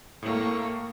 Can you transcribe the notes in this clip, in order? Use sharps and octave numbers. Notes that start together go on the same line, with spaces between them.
A2 A3 A#3 C#6